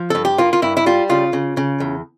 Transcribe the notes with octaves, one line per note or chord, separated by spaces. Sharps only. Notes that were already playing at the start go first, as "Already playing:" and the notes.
Already playing: F3
G2 A4
G4
A#3 F4
F4
G2 E4
E4
G3 F4
C#3 F4
C#3
C#3
E2